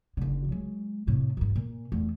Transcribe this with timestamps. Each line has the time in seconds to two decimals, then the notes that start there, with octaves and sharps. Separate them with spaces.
0.17 F#1 D3
0.49 F#3 G#3
1.07 A2 C3
1.37 A#1 G2
1.56 A#2
1.92 E2 A3